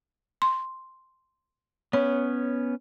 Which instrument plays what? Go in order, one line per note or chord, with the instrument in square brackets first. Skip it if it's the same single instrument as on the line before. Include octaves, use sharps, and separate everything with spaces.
[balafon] C6
[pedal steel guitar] B3 C#4 [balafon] C#5